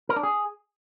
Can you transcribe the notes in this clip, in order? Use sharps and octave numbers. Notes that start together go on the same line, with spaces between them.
A#4
D4
G#4